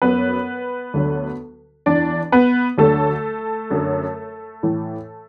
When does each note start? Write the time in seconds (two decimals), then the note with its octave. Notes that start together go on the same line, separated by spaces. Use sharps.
0.02 F#2 F#3 B3 B4
0.94 D2 D3 F#3
1.86 E2 E3 D4 D5
2.32 B3 B4
2.78 D2 D3 F#3 A3 A4
3.71 F#2 D3 F#3
4.63 A2 E3